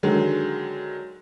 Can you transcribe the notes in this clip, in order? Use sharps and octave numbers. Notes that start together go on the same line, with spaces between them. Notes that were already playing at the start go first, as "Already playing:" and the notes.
D3 D#3 F#3 G#3